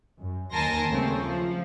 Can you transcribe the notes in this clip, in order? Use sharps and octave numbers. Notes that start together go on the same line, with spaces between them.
F#2
D#2 A#4 G#5 A5 C6 A#6
C#3 G3 A3 A#3 C4 C#4
F3